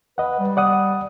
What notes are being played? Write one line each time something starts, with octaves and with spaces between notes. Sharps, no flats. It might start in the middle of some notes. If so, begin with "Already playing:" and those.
B4 D#5 F#5
G3
D5 F#5 D#6